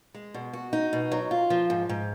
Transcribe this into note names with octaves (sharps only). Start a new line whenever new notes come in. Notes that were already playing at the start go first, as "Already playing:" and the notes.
G#3
B2
F#4
D#4
B2
F#3
F4
F3
G#2
G#2